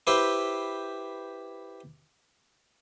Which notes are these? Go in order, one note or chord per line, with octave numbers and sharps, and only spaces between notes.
E4 G4 B4 C5 G5